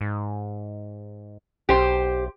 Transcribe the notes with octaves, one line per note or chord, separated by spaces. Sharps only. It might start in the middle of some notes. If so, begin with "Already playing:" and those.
G#2
B1 G4 C5